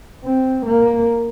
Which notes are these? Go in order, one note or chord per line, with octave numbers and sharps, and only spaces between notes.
C4
A#3